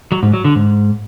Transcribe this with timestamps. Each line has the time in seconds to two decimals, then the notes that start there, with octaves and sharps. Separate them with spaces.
0.12 F#3
0.23 G#2
0.34 F#3
0.44 D3
0.55 G#2